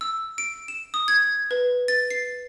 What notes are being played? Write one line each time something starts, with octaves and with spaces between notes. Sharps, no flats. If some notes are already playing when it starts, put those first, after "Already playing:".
E6
D7
E7
D#6
G#6
B4
A6
C7